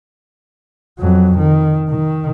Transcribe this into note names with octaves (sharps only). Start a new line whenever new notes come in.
F2 F#3
D#3
D#3